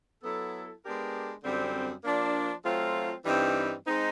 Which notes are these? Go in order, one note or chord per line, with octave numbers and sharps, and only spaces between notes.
F#3 B3 E4 A4
G#3 B3 D4 G4 A#4
F#2 D3 G3 C4
F3 A#3 D4
F#3 A3 C4 F4
G2 E3 G3 C4 D#4
G#3 C4 D#4